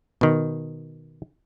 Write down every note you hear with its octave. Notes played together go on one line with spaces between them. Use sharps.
B2 D#3